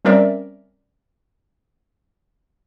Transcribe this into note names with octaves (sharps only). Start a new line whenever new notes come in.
G3 C4 C#4 A#4 D5 E5